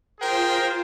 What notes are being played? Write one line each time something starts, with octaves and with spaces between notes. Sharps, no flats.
F4 G#4 A#4 C5 G5